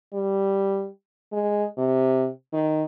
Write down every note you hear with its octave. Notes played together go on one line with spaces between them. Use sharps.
G3
G#3
C3
D#3